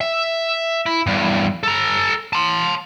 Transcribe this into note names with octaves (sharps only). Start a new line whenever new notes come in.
E5
E4
E2 G2
A4 A#5
A5 C6